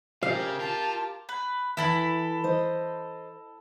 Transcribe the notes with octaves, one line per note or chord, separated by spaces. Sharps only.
C#3 G4 A#4 F5
F4 A5
B4
E3 E4 A4 B5
C5 D#5